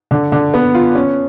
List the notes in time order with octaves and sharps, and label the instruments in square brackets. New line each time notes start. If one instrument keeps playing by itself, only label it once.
[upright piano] D3
D3
B3
F4
C#4